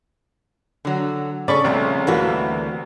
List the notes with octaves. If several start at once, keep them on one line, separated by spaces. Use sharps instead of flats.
D3 F#3
C#3 C#4 A4 D5 B5 C#6
C2 F2 A#2 A3
D2 E3 G3 A3 A#3 F#4